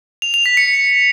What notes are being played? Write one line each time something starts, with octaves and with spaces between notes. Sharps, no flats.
F7
F7
B6
C#7